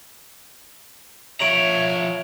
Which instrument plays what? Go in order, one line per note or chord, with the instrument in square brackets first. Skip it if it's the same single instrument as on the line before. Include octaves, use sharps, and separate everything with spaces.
[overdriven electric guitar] F3 A#5 [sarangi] C#5 [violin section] E5 [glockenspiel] D7 F7 F#7